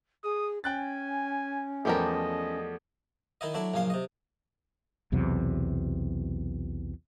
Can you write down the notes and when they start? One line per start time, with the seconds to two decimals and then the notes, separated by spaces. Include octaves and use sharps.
0.24 G#4 D#6
0.64 C#4 G5 G#5 F#6 A6
1.85 E2 F3 G3 A3 G4 A#4 D#5
3.41 D#3 D#4 E4 D#5
3.54 F#3 A3 D4 E4
3.74 A#1 F#2 C#3 F5 C6
3.90 C3 D#5
5.12 B1 E2 C3 F#3